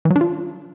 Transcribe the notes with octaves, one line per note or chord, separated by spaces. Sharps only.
E3
F#3
D4
F4